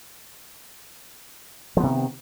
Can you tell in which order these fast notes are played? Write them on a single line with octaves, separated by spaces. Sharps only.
F3 B3 C3 D#3